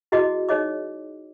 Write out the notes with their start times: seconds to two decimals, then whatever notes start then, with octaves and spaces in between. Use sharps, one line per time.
0.12 E4 F#4 G#4 D#5 D6
0.49 D#4 G#4 C#5 D#5 D6